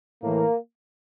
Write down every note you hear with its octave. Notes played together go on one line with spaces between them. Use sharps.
A2 E3 A#3